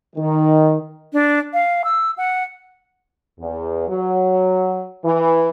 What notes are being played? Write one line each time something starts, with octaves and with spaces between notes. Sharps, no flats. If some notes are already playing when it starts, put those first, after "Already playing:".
D#3
D4
F5
E6
F#5
E2
F#3
E3